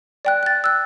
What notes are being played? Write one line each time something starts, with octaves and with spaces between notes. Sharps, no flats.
D5 G5 F#6
F#6 A6
E6 F#6